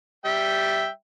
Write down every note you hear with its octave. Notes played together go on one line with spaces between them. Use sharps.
G3 E5 G5